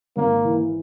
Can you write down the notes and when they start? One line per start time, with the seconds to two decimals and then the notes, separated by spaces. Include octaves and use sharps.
0.17 G#1 A#3
0.44 E3